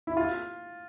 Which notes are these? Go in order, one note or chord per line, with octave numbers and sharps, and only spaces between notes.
E4
F4